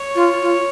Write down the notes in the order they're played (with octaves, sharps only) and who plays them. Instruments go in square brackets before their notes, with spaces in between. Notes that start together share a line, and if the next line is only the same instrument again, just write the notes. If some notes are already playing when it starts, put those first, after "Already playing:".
Already playing: [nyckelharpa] C#5
[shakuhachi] F4
F4